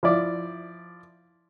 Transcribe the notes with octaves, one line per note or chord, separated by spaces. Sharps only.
F3 E4 D5 D6